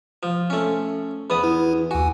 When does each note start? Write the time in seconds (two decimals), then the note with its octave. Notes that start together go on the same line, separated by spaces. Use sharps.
0.23 F3
0.50 A3 C#4
1.30 E2 B3 B5 D#6
1.44 E4
1.91 D#2 F#4 G#5